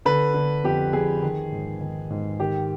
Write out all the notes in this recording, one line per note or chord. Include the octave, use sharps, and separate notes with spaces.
D3 B4
D3
F2 G4
F2 G#4
D#3
G#2
D#3
G#2
D#3 G4